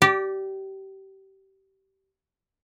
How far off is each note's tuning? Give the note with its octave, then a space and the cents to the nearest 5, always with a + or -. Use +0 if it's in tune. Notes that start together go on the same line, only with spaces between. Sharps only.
G4 -25 D5 +0